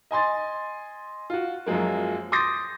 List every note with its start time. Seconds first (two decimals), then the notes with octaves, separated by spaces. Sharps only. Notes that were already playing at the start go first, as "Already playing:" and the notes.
0.11 D#5 G#5 C6 A6
1.30 F4 F#4
1.66 F#2 F3 F#3 G#3 A#3
2.32 C6 D6 D#6 G6 A6 A#6